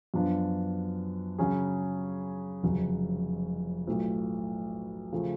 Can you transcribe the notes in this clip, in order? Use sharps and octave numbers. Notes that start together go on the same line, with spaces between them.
F#2 F3 B3 D4 F4
C#3 F#3 C#4 G#4
F1 F2 C#3 F#3
B1 A2 F3 A3
C#3 F3 A3